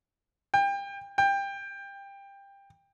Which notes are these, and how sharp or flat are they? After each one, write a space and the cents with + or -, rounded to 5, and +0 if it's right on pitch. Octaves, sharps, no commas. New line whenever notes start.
G5 +30
G5 +20